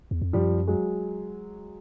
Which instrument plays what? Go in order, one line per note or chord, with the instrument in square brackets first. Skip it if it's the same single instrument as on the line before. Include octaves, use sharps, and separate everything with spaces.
[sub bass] E2
F2
[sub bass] F#2 [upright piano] F3 G3
[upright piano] F#3 G#3